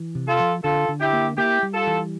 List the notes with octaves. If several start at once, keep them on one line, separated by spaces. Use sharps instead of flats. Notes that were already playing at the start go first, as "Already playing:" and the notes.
Already playing: E3
C3
F4 A4
F3
D3 F4 A4
D3
E4 G4
A#3
A#3 E4 G4
G3
F4 A4
E3